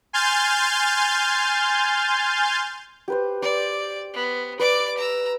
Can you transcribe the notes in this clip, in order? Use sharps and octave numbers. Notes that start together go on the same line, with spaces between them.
G#5 C6 F6 G6 A6
G4 B4 C5
D5 C6 D6
B3
B4 D5 D6
A#5 E6